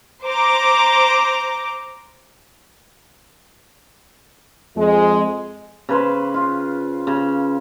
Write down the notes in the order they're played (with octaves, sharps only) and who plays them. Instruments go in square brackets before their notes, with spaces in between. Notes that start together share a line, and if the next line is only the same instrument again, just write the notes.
[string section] C5 A#5 D6
[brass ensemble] F2 G#3
[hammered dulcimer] C#3 B4 C5
F4
C#3